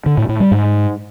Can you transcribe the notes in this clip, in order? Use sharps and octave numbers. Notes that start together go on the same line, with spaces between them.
D3
A2
A2
G3
G#2